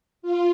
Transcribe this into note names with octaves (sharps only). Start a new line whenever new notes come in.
F4